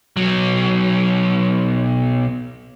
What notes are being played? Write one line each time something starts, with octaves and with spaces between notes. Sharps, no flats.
B1 F#3